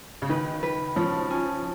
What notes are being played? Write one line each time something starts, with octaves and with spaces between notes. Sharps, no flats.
C#3
D#3 B4
B4
F3 C#4
C#4